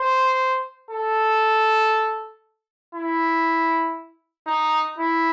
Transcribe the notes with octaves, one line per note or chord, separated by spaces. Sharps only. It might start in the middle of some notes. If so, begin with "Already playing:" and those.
Already playing: C5
A4
E4
D#4
E4